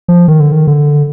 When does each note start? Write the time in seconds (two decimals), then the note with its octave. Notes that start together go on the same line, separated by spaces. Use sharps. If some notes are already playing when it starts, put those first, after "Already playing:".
0.08 F3
0.28 D#3
0.40 D3
0.52 D#3
0.67 D3